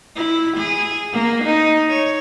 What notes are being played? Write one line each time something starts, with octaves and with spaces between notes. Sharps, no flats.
E4
G#4
A#3
D#4
C#5